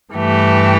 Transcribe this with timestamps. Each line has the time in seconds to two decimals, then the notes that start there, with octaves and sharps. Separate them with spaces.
0.13 G2 E3 A3 G4